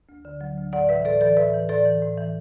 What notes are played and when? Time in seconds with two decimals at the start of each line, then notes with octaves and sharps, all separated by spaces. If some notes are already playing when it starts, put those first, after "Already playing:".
0.09 D2
0.25 D3
0.41 F#3
0.57 D2
0.73 A2 D5 F#5
0.89 E3 B4 E5
1.05 A2 A4 D5
1.21 E3 A4 D5
1.37 A2 B4 E5
1.54 E3
1.69 A2 A4 D5
1.86 E3
2.02 A2
2.18 E3